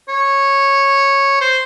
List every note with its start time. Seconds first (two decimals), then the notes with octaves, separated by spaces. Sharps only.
0.08 C#5
1.41 C5